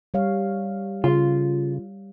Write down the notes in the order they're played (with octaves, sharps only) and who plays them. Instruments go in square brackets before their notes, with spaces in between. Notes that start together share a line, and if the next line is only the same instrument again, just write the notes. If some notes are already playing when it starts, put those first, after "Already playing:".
[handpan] G3 C#5 F5
[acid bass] C#3 [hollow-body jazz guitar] F4